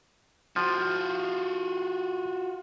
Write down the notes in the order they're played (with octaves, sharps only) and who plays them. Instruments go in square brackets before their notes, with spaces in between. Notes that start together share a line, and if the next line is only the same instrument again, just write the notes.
[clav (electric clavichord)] F3 [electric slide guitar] F4 F#4